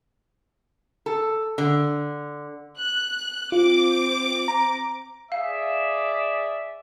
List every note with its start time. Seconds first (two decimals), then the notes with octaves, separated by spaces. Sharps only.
1.06 A4
1.58 D3
2.78 F#6
3.52 C4 F4 D6
4.48 A#5
5.32 G#4 D5 E5 F5